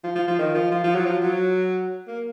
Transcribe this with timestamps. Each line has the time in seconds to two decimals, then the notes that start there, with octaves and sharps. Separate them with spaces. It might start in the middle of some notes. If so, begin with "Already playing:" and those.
0.04 F3
0.15 F3
0.28 F3
0.39 D#3
0.55 F3
0.72 F3
0.84 F3
0.95 F#3
1.06 F3
1.23 F#3
2.07 A#3